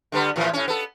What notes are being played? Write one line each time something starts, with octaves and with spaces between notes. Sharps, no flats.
D3 G3 B3
A2 E3 F3
A2 C#4
B3 A4